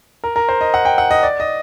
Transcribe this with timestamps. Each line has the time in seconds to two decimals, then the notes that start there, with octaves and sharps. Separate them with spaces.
0.24 A#4
0.36 A#4
0.49 C5
0.61 D#5
0.74 F#5
0.85 G5
0.98 F#5
1.11 D#5
1.23 D5
1.40 D#5